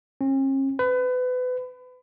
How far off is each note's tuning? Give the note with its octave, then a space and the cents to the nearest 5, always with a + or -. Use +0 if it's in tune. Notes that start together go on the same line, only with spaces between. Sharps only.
C#4 -45
B4 +30